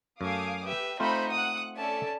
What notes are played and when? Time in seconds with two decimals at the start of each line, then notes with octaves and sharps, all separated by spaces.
0.21 F#2 A3 F5 G#5 D6 D#6
0.65 G4 B4 E5
1.00 A3 C4 D#4 F4 C5 B5 C#6 G6
1.32 F#5 D#6 F#6
1.76 C#4 A4 D5 E5 A5